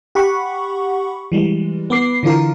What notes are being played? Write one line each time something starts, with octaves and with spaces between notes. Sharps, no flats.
G4 F#5 B5 C#6
E3 G3 G#3
B3 B4 D6 C7
D3 E3 D4 F4 A#4